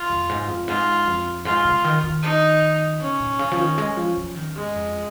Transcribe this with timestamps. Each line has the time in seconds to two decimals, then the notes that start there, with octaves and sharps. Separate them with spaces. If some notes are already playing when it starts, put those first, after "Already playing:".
Already playing: F4
0.10 F2
0.29 G#2
0.48 F2
0.68 G#2 F4
1.07 F2
1.45 G#2 F4
1.65 C#3
1.84 D#3
2.03 D#3
2.23 D#4
3.00 C#3 C#4
3.20 A#2
3.39 C#3
3.52 F3
3.59 D#3
3.78 G#3
3.97 F3
4.17 F3
4.36 D#3
4.55 G#2 G#3
4.75 F2